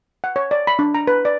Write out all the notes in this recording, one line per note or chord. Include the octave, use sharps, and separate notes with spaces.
F#5
C#5
D5
B5
D4
A#5
B4
D5